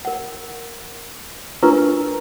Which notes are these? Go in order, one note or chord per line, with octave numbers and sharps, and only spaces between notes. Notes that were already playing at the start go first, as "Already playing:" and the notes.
A#4 F#5
D4 F4 A#4 B4 A#5 C#6